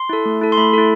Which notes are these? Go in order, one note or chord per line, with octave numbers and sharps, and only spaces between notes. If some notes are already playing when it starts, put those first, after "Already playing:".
Already playing: C6
E4 A4
A3
E4 A4
C6
A3 B5
E4 A4